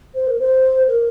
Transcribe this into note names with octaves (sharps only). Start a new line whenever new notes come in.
C5
A#4
C5
A#4